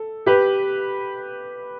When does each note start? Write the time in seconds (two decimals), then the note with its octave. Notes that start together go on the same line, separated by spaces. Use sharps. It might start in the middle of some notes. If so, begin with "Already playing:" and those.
Already playing: A4
0.26 G4 B4